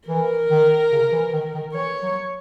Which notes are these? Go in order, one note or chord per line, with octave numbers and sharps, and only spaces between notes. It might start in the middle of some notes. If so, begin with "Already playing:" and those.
E3 A#4
D#3
C#3
E3
D#3
D#3
E3 C#5
F#3